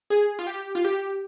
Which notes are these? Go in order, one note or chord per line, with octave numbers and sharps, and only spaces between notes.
G#4
F4
G4
F4
G4